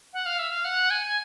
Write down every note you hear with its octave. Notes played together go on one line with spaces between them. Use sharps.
F#5
F5
E5
F5
F#5
G#5